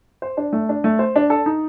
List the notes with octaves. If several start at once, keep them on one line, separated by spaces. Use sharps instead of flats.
C5
D4
A3
D4
A3
C5
D4
A4
D#4